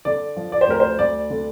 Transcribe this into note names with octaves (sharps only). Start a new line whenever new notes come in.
D3 D5
F3
D5
C5
D2 A#4
C5
D2 D5
D3